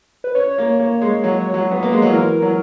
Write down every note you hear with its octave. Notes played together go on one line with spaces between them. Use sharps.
B4
C#4 C#5
A#3
A#3
G#3
F#3
F#3
B3
A#3
G#3
F#3
E3 A#4
F#3